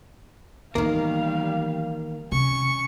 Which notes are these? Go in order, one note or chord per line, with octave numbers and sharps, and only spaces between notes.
D#3 E3 G3 A#3 B3 F5
C3 C#4 C#6